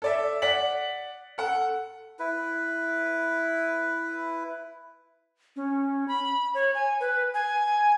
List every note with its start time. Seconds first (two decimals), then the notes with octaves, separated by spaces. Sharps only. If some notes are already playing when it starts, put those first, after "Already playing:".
0.02 A4 D5 E5
0.42 D5 F#5 B6 F#7
1.38 A4 F#5
2.19 E4 B4
5.56 C#4
6.08 B5
6.54 C#5
6.75 G#5
7.00 B4
7.34 G#5